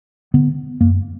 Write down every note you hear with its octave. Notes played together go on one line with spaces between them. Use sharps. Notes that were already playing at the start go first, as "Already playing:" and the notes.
D3 B3
F#2 A#3